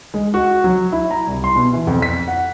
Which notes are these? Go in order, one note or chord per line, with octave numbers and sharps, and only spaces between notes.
G#3
F#4
F#3
E4
A#5
C2
C6
B2
E3
F2
B6
F#5